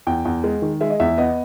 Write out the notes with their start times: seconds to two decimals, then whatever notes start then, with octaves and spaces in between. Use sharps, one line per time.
0.07 E2 G5
0.25 E2
0.44 G#3
0.62 D#3
0.81 G#3 E5
0.90 D#5
1.00 E2 E5
1.18 B3 D#5